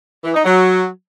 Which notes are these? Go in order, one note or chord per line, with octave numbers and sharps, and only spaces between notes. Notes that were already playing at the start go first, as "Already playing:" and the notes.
E3
D#4
F#3